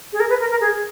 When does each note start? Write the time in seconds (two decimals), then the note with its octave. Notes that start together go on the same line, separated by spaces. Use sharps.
0.13 G#4
0.20 A#4
0.30 B4
0.40 A#4
0.51 A#4
0.61 G#4